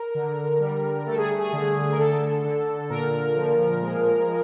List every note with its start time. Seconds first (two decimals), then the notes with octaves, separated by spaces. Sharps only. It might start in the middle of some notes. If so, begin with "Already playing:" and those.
Already playing: A#4
0.15 D3
0.60 G3
1.06 A3 A4
1.18 G#4
1.39 G#4
1.53 D3
1.92 A#4
1.98 D3 A4
2.44 D3
2.90 A#2 A#4
3.36 F3
3.82 G#3
4.28 G#3